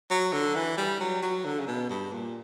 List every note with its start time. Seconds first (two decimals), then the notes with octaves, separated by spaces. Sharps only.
0.10 F#3
0.33 D3
0.55 E3
0.78 G3
1.00 F#3
1.23 F#3
1.45 D3
1.60 C#3
1.67 B2
1.89 G2
2.12 A#2